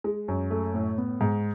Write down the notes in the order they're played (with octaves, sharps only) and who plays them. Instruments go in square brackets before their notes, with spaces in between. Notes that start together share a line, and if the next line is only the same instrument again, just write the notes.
[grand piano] G#3
F#2
A3
A2
B3
G#2